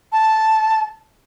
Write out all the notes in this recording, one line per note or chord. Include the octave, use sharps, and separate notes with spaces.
A5